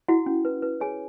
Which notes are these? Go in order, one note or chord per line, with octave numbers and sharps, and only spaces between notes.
E4 F#4 F#5
C#4
B4
B4
G#4 C#5 G#5